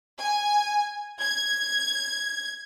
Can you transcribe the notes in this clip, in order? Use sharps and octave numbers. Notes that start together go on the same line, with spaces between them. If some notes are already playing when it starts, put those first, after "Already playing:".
G#5
G#6